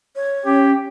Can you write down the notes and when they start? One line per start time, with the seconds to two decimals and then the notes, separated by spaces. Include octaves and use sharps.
0.16 C#5
0.45 C#4 G4